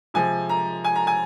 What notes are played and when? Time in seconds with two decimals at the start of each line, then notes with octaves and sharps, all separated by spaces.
0.14 C3 F3 G#3 G#5
0.49 A#5
0.84 G#5
0.96 A#5
1.07 G#5